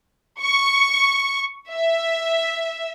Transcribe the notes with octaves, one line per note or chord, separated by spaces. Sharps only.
C#6
E5